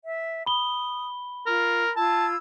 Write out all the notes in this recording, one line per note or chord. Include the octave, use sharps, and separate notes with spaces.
E5
B5 D#6 G7
F4 A#4
F4 A5 E6 G#6